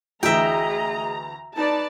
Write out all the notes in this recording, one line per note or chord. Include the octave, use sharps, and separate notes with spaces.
D2 E3 G#4 D#5 E5 G5 A#5
D#4 B4 D5 A5